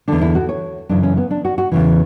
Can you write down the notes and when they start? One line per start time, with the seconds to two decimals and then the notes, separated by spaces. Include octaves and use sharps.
0.08 E2 D3 D4
0.21 E4
0.35 F#4
0.49 C#5
0.89 F#2 C#3 E3 D4
1.03 C#4
1.17 B3
1.31 D4
1.45 F#4
1.58 F#4
1.72 E2 C#3 E3